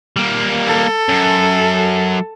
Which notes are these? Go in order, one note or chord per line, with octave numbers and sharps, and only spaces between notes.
G3 A#3
A4
F#2